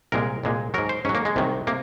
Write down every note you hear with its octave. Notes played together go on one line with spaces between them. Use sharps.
C2 A#2 G#3 A#4
C2 A#2 G#3
G#2 F#3 A#4
C5
G#2 F#3 C#4
A#3
G#3
C2 C3 D#3 F#3
C3 A#3